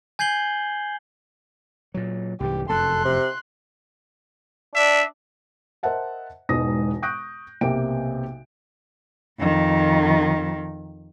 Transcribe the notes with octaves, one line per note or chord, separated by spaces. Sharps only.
G#5 G6 G#6 C7 F#7 G7
A#2 F#3
C2 G#2 E3 G4
F1 F#2 A4 C6 F#6
C3
D4 E5
A#4 C5 D#5 E5 F#5 A5
E1 G#2 B2 D#4 D#6 A#6
C#6 D#6 F#6 G6 A#6 D7
B1 C3 A#3 G5 D7
F2 D#3